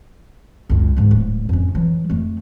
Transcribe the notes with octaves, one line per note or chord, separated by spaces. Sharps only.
C#2 F#2
G#2 D3
D1
F2 C#4
E3 F#3
F2 A3